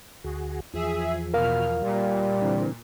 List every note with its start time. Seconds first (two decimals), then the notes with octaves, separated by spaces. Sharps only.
0.24 D2 F#4 G#4
0.74 E2 F3 G#4 E5
1.34 B2 A#4 F5 F6
1.83 A#2 G3
2.42 D3 E3 C4